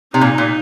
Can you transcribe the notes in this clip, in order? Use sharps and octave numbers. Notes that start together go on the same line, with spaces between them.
C3 D#4
A#2
A#2